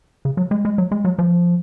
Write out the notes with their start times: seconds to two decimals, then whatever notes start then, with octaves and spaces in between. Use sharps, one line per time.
0.25 C#3
0.37 F#3
0.51 G#3
0.65 G#3
0.78 F#3
0.91 G#3
1.05 F#3
1.18 F3